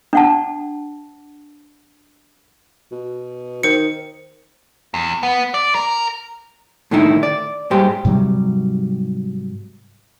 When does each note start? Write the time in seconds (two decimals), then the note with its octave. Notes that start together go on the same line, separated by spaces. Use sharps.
0.13 D4 F#5 A5
2.92 B2
3.63 D#3 C5 C#7
4.94 E2
5.23 B3
5.54 D5
5.75 A#4
6.91 A2 D3 D#3 D#4 E4
7.23 D5
7.71 G#2 G3 G4 C5
8.05 G#2 C3 F#3 G3